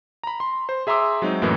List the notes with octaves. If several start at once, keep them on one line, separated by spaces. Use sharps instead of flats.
A#5 B5
C6
C5
G#4 E5 A#5 C6 D6 E6
F#3 G#3 C4 D#4
F#2 A2 E3 A#3